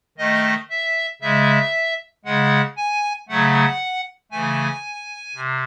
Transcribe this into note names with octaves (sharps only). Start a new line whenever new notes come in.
D#3 A3 D#5
E5
C#3 G#3 E5
C#3 G#3 F#5
G#5
C#3 F#3 A3 F#5
C#3 E3 A3 G#5
C3